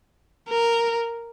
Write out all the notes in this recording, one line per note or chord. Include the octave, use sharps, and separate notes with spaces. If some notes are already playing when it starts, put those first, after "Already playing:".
A#4